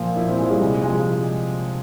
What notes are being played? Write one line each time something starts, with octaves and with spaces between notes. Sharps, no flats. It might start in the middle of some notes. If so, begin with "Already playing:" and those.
Already playing: A#2 F3 F4
A#2 E4
C4
F3 G#3
G3
C3 G#3
F3 G#3